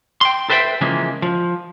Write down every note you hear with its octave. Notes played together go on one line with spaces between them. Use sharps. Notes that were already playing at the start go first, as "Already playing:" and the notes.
G5 C6
A4 B4 C5 E5 F#5 G5
C#3 E3 F3 G#3 A#3 C#4
F3